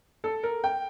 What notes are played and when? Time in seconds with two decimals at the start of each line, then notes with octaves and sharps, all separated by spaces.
0.24 A4
0.43 A#4
0.64 G5